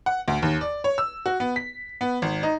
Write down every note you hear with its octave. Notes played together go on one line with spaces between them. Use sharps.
F#5
D2
D#2
D5
C#5
E6
F#4
B3
B6
B3
G#1
D#4